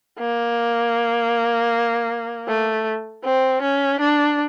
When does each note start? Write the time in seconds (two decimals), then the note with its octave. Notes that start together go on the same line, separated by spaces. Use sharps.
0.20 A#3
2.48 A3
3.24 C4
3.62 C#4
4.00 D4